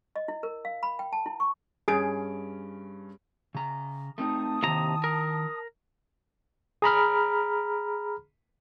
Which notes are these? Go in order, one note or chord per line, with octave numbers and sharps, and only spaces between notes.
D#5
E4
A#4
F5
B5
G5
A5
E4
C#6
G2 C#4 G#4 D7
C#3 A#5
A3 C4 D#4 A5 D#6
D#2 C3 D#3 E4 A#5
A#4
G#4 A#5 B5 F6